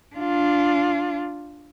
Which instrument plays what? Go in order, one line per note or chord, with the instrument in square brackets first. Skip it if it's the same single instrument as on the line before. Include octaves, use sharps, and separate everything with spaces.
[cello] D4 F4